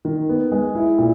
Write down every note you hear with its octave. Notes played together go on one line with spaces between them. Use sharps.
D#3
B3
G#3
E4
A#2